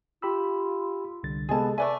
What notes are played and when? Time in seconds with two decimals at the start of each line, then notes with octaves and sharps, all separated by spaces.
0.22 F4 G4 B5 E6
1.23 C2 D3 A6
1.49 C3 G#3 B3 G#4 A4 G#5 A5
1.78 A3 B4 D5 E5 G#5